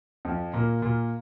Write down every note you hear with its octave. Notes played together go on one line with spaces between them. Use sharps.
F2 F3
A#2 A#3
A#2 A#3